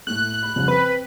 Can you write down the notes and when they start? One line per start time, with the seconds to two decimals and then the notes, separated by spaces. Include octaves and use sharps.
0.07 A2 A3 F#6
0.43 B5
0.56 C2 F2 C#3
0.68 C4 B4